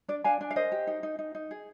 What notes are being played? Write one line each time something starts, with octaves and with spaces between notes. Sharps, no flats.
D4 D5
D4 F5 G#5
D4
F5
A#4 C5 D#5
G4
D#4
D#4
D#4
D#4
G#4